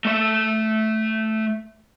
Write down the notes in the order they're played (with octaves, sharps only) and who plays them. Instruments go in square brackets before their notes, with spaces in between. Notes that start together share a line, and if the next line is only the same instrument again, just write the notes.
[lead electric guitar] A3 E5